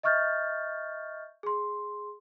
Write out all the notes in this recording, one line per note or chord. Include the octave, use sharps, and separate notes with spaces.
D#5 E5 C#6 F6 G6 A6
G#4 C6